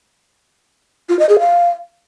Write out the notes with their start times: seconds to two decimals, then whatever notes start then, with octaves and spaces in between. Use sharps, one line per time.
1.09 F4
1.19 D#5
1.29 G#4
1.39 F5